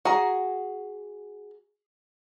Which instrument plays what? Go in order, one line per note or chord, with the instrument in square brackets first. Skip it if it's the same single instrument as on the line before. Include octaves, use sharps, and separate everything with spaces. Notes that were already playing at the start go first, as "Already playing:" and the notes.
[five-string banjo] F#4 G#4 A#5